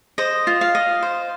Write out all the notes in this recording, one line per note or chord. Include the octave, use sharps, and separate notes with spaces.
C5 D#5
F4
F5
D#5
C5